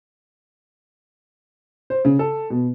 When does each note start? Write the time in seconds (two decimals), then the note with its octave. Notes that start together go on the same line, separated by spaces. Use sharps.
1.90 C5
2.05 C#3
2.19 A4
2.50 B2